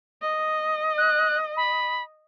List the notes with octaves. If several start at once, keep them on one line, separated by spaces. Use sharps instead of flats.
D#5
F#6
B5